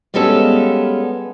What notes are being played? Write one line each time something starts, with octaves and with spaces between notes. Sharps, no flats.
G3 G#3 B3 C#4 A4 F5